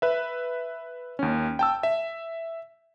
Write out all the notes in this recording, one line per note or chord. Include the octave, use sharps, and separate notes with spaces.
B4 E5
D#2 C#4
G5 A5 E6
E5